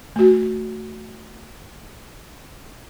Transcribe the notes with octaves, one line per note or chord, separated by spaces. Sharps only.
A3 F#4